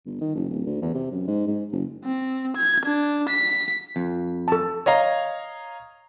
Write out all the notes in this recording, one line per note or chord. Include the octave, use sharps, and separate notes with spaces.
G1
D#3
F#1
D1
D2
E2
C3
F#2
G#2
G#2
F#1
C4
G#6
D4
B6
F2
A4 A5
C#5 D#5 F5 A#5